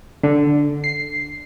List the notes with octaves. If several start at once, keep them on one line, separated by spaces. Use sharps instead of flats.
D3
C7